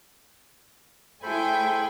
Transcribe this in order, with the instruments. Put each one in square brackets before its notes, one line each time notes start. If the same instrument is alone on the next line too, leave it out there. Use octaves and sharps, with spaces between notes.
[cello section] A3 E4 G#4 [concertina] A4 C5 B5 [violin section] G5 G#5